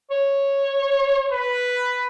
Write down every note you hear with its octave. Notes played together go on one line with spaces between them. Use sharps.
C#5
B4